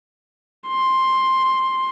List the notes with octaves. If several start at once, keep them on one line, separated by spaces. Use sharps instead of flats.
C6